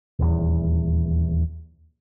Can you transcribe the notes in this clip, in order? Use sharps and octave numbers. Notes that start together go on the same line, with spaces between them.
D#1 E2